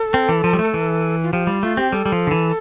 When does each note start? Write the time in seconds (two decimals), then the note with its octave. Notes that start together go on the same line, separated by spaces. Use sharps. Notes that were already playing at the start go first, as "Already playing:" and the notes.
Already playing: A4
0.14 C4
0.29 E3
0.44 F3
0.53 G3
0.59 A3
0.74 E3
1.23 F4
1.33 F3 G4
1.47 G3 F4
1.62 A3 F4
1.77 C4 G4
1.92 G3 A4
2.06 G3
2.12 F3
2.27 D3
2.31 E3